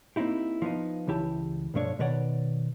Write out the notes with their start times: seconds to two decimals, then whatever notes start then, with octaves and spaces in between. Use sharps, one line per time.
0.16 A#3 C4 D#4 E4 G4
0.62 F3 B3 D#4
1.07 C#2 E3 E4 G4 A5
1.74 B1 G2 F3 A3 D4 C#5
1.99 B2 D#3 B4 C#5 D5 F#5